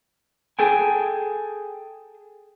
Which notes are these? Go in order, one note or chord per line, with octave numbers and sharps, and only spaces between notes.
G#4 A4 G5 G#5